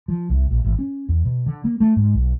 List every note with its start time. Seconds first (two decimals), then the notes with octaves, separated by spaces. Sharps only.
0.08 F3
0.29 C2
0.51 A#1
0.64 G#1
0.79 C#4
1.08 E2
1.25 B2
1.46 D3
1.64 A#3
1.80 A3
1.96 G#2
2.14 B1